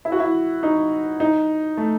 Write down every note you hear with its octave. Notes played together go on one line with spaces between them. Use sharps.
E4
F#4
E4
D#4
D#4
A3